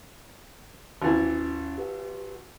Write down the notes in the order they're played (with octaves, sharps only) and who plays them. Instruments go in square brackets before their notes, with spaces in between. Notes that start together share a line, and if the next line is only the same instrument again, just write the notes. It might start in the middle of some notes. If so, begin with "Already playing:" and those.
[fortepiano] G#1 E3 [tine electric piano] D#2 C#4 A6
[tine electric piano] G4 B4 F#5